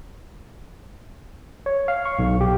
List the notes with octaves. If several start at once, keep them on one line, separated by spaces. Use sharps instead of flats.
C#5
F5
C#6
B1
G4